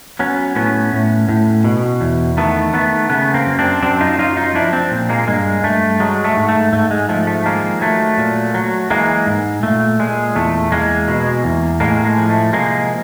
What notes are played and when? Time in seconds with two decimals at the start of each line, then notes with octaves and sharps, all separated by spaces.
0.19 F#3 B3 C#4
0.56 A2 B3 C#4
0.93 A2
1.29 A2
1.64 B2
2.01 E2
2.37 D#3 A3 B3
2.74 D#3 A3 B3
3.10 C#3 A3 B3
3.34 A#3 C4
3.46 F#2
3.58 C4 D4
3.83 F#2 C4 D4
4.01 D#4 F4
4.19 F#3 D#4 F4
4.37 D#4 F4
4.55 F3 D4 E4
4.73 C4 D4
4.91 A#2
5.09 G#3 A#3
5.27 G2 G#3 A#3
5.64 G2 A3
6.00 F#3 G#3
6.24 A3
6.36 G#2
6.49 A3
6.73 G#2 A3
6.91 G#3
7.09 F3 A3
7.27 A3
7.45 D#3 G#3 A#3
7.81 F#3 A3
8.18 A#2
8.54 F#3
8.90 E3 G#3 A#3
9.26 G#2
9.63 A#2 A3
9.99 A#2 G#3
10.35 E2 A3
10.72 E2 G#3 A#3
11.08 B2
11.44 E2
11.80 A2 G#3 A#3
12.05 G#3
12.17 F3
12.29 A3
12.53 C3 G#3 A#3